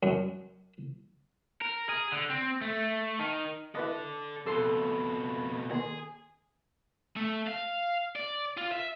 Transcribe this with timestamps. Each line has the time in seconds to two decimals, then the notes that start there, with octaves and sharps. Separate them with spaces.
0.03 F#2
1.62 A#4
1.89 G#4
2.12 D3
2.30 C4
2.61 A3
3.20 D#3
3.75 E4 A4 B4 D5 D#5
4.46 F2 B2 A4 C6
5.71 D#2 G#4 C6
7.17 A3
7.47 F5
8.16 D5
8.57 F4
8.72 E5